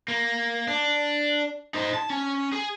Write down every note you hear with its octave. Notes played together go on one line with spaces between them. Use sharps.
A#3
D4
D#4 C5
A5
C#4
G#4